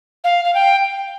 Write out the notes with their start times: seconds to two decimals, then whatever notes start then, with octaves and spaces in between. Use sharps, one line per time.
0.24 F5
0.45 F5
0.55 G5